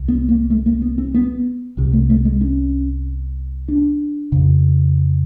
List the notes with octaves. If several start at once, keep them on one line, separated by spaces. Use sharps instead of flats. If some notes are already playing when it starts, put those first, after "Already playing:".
Already playing: C2
B3
A#3
A3
A#3
B3
C4
B3
C2 C3
A3
A3
G#3
C#4
D4
F2 C#3